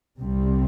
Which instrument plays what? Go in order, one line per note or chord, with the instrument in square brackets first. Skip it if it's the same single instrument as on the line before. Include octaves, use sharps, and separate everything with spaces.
[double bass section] C2 C3 G3 C4